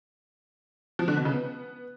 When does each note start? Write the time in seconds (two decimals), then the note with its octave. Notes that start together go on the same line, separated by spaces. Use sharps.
0.99 F3
1.08 D3
1.16 B2
1.25 C#3
1.34 B3